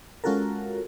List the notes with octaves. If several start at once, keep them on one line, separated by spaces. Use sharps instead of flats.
G#3 C#4 F4 F#4 A4 A#4